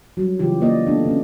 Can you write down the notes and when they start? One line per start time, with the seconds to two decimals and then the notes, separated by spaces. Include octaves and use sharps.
0.17 F#3 G3
0.39 C#3 E3 F4 G4
0.61 A#3 D5 D#5
0.87 A3 B3 D4
1.05 D3 C#4